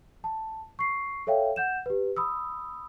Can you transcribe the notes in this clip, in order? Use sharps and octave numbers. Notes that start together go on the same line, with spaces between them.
A5
C#6 C7
A4 C#5 E5 F5 G5
F#5 G6 E7
G4 B4
B5 D#6 E6